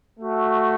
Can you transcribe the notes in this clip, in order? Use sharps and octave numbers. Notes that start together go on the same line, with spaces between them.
A3 F#4